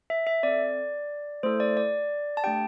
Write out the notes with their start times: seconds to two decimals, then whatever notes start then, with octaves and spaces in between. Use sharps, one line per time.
0.10 E5
0.27 E5
0.43 C4 A4 D5
1.43 A3 E4 A4 C5
1.60 D5
1.77 D5
2.37 A5
2.44 A3 D4 G4 G5